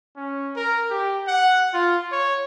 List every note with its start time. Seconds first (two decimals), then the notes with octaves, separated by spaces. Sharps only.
0.17 C#4
0.56 A#4
0.90 G4
1.28 F#5
1.74 F4
2.12 C#5